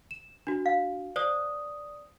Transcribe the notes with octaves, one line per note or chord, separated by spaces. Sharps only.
E7
D4 F#4
F5
C5 D5 D#6